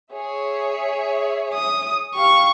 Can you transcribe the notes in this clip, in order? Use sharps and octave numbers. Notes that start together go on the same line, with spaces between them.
G#4 C#5 E5
D#6
G4 F5 C#6